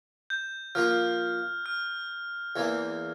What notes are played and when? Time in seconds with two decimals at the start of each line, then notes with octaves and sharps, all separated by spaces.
0.30 G6
0.75 F3 A#3 F4 F6
1.66 F6
2.56 E2 E3 A#3